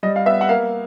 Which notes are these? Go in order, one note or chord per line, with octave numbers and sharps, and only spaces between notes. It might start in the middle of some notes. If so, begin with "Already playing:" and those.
G3 D#5
F5
B3 E5
F#5
A#3 F5